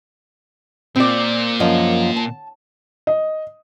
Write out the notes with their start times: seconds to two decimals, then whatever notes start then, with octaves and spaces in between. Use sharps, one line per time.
0.96 A#2 C4 D5
1.60 F#2 F3 D#5
2.16 A5
3.07 D#5